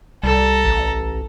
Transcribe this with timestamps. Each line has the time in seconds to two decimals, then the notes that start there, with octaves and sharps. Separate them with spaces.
0.23 C2 G3 A4 A#5
0.65 A1